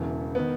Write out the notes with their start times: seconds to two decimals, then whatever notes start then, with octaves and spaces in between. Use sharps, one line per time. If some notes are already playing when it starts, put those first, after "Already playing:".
Already playing: E1 E2 C#3 E3
0.35 D#3 B3